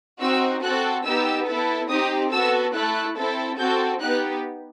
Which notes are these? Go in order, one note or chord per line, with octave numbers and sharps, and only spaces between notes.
C4 D#4 F#4 E6
C4 F#4 A4 F#6
B3 D#4 G4 E6
B3 E4 A4
C4 D#4 G4 D#6
B3 F#4 A4 E6
A3 E4 A4 F#6
C4 E4 A4
C4 F#4 A4 G6
B3 D#4 G4 F#6